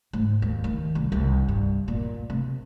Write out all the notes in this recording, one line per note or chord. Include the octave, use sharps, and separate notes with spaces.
G#2
D#2
D#3
C2
C2
G2
A#2
C3